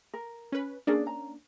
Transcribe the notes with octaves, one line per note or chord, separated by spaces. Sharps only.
A#4
C#4 B4
A#3 C#4 D4 G#4 D5
A#5